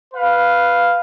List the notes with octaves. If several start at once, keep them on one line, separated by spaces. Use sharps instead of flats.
B4 F5